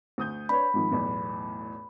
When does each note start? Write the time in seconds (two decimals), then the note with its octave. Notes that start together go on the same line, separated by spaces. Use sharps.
0.18 D2 D#6 G6
0.49 D4 B4 C#5 B5
0.74 G#2 D#3 F3
0.91 B1 E2 A2